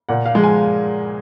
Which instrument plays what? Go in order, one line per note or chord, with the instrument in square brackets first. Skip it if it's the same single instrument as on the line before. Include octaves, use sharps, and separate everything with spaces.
[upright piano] A#2 F#5
F5
F3 G#3
G#5